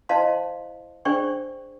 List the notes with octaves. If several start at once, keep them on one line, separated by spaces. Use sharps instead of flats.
E4 C5 D#5 F5 A5 C6
D4 G#4 C5 D5 G5 C#6